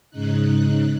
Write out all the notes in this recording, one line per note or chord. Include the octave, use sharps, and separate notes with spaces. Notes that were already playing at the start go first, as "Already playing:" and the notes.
G#2 C#3 D#4 F#6